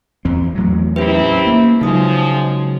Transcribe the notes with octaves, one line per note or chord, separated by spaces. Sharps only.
E2 C4
E2 A2 F#3
D#2 C4 C#4 E4 G4 B4
A#3
C#3 F3 F#3 G#3 D#4 D#6